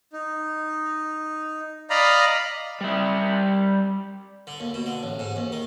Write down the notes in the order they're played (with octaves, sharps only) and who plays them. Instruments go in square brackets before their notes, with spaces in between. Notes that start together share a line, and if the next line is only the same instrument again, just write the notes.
[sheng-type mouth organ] D#4
D5 D#5 F5 A#5 B5
[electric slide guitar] G3 E5
[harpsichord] D3
D#2
B2
D3
A1
G#2
D#2
D#3